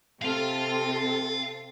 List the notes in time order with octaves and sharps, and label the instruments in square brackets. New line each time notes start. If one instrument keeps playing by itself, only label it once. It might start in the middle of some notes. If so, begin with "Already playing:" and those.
[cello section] C3 C4 A4 [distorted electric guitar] F5 C6